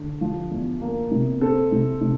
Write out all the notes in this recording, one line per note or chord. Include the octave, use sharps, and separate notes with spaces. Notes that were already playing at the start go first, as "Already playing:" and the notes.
Already playing: D3
F3
E2
A#3
C3
C4 A4
C3
C3